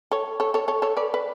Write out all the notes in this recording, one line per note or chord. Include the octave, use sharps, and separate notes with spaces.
A4 C#5
A4 C#5
A4 C#5
A4 C#5
A4 C#5
B4 D5
B4